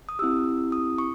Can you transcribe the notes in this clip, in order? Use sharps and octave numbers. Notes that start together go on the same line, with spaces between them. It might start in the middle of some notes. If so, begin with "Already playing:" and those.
D#6
C4 E4 G4 E6
D#6
C#6